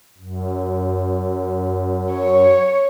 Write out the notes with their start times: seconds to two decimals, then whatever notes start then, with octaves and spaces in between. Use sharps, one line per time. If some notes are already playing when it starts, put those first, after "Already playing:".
0.18 F#2
2.11 C#5